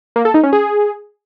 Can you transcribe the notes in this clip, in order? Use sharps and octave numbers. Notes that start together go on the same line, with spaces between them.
A#3
A4
D#4
C#4
G#4